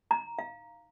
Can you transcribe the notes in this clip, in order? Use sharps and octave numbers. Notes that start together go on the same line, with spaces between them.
A#5
F5